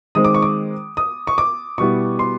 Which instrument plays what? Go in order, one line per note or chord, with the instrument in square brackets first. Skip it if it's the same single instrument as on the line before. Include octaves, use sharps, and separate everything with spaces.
[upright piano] D#3 G#3 C4 D#6
D6
C#6
D6
D#6
C#6
D6
B2 G3 B3 E4 C#6
C6